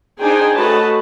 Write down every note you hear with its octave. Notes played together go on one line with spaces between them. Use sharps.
D4 D#4 G#4 C5 G5 G#5
A3 F#4 B4 C#5 D#5 A5